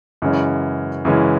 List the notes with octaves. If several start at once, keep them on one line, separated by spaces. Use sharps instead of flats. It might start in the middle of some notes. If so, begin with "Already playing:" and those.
F#2 C#3 E3 G#3 C#4
F#2 C#3 E3 G#3 C#4